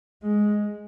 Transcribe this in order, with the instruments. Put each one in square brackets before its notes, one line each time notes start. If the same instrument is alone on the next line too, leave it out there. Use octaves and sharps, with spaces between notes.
[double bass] G#3